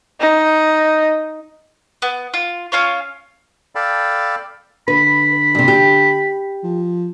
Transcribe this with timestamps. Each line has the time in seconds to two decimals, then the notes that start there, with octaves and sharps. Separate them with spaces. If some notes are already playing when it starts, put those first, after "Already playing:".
0.20 D#4
2.02 B3
2.34 F4
2.72 C#4 F4 C#5
3.75 A4 D5 F5 G5 A5 B5
4.88 D3 B4 B5
5.55 G2 C3
5.68 G4
6.64 F3